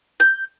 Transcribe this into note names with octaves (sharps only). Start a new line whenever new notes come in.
G6